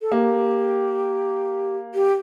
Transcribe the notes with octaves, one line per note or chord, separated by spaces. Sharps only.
A4
A#3 G4
G4